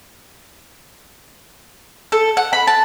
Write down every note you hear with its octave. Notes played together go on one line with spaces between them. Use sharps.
A4
F#5
B5
A5